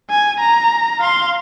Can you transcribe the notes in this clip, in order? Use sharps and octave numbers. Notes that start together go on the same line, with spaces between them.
G#5
A#5
F5 C6